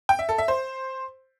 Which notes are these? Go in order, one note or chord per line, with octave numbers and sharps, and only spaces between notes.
G5
E5
A4
E5
C5